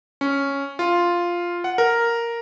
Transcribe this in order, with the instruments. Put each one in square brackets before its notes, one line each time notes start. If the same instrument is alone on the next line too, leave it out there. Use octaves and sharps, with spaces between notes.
[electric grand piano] C#4
F4
F#5
A#4